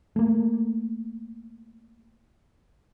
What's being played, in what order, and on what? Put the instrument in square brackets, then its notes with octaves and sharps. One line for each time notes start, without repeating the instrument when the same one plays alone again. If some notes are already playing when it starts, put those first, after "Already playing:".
[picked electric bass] A3 A#3